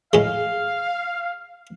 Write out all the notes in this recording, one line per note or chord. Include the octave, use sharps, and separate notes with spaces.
A2 G#3 F5